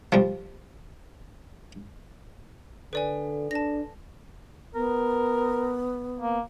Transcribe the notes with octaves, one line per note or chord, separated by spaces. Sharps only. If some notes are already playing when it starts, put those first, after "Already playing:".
F3 G3
D3 A4 B4 D5 G#5
D4 A5 A#6
B3 A#4
A#3